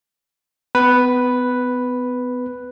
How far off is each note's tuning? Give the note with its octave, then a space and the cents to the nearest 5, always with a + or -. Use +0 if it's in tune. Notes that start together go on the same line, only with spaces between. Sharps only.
B3 +30 B4 +0